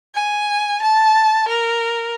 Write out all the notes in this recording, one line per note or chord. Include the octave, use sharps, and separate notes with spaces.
G#5
A5
A#4